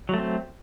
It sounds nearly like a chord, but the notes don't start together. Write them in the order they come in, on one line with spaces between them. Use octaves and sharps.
F#3 A3 C4